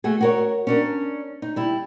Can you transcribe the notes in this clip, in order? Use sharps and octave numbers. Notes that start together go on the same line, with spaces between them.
A3 F#4 G#4
F#4 A#4 C#5
C#4 D4 A#4
D#4
G3 E4